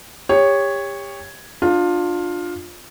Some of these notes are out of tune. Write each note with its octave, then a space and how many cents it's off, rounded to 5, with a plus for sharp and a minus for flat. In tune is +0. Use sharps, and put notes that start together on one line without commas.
G4 +30 C#5 +0
D4 +25 F4 +15